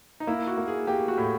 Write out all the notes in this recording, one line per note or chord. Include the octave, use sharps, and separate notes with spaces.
D#4
A#3 E4
F#4
A#3
G#4
A#3 G4
F#4
A2